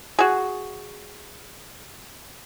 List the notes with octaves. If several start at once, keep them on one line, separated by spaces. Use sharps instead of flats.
F#4 G#4